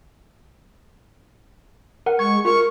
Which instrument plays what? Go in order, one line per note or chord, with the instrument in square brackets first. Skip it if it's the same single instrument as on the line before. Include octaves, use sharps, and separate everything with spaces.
[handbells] A#4 F#5
[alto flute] G#3 [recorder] C#6 [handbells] G#6
[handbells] F4 [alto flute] A#4 [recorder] C#6